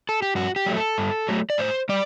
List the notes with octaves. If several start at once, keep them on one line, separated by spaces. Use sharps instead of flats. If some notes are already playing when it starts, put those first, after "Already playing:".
A4
G4
G2 F#4
G4
F#3 A3
A4
G2
F#3 A3
D5
A2 C5
G3 D5